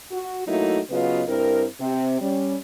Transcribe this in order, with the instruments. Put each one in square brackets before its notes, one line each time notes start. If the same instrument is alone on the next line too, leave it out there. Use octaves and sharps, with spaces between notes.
[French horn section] F#4
F#3 A3 A#3 D#4 E4 F#4
C#3 F#3 B3 F4 B4 D#5
G2 C4 E4 A#4
C3 C4
G3 C#4